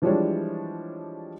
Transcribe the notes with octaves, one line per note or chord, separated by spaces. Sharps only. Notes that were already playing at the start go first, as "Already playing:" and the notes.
E3 F3 G3 G#3 D4 C#5